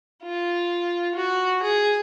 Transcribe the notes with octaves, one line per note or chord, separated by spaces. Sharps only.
F4
F#4
G#4